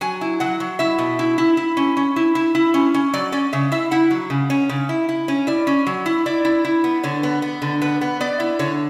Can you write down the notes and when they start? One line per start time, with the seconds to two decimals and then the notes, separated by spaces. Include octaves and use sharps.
0.01 F#3 G#5
0.21 E4
0.40 F#3 F#5
0.60 F#3
0.79 E4 E5
0.98 B2
1.19 E4
1.38 E4
1.57 E4
1.77 C#4
1.97 C#4
2.16 E4
2.35 E4
2.55 E4
2.74 C#4
2.94 C#4
3.14 F#3 D5
3.32 C#4 D5
3.53 C#3 E5
3.72 E4 E5
3.91 E4 F#5
4.11 F#3
4.30 C#3
4.50 C#4
4.69 C#3
4.89 E4
5.09 E4
5.28 C#4
5.47 E4 D5
5.67 C#4
5.87 F#3
6.06 E4
6.26 E4 D5
6.45 E4
6.65 E4
6.84 B3
7.03 D3 C#5
7.23 B3
7.42 B3
7.62 D3
7.82 B3 B4
8.01 B3
8.21 B3 D5
8.40 E4
8.59 D3 C#5